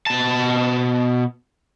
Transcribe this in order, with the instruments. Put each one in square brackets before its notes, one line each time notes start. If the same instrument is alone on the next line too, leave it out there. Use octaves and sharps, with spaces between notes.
[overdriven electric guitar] B2 A5